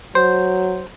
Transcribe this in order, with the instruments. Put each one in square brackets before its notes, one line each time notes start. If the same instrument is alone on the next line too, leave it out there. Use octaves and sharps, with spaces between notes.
[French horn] F#3 [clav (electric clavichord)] C5